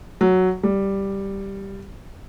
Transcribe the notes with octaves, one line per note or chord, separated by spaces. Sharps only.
F#3
G3